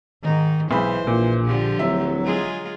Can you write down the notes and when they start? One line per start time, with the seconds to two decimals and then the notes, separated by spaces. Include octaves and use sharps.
0.23 G#2 D#3 D#4
0.71 B1 E3 G#3 C5 B5
1.07 A#1 A#2
1.45 D3 F3 G4
1.79 D1 F#3 E5
2.25 G#3 F4 G#4